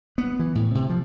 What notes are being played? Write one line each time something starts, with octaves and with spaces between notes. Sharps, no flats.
B3
E3
A2
C3
F3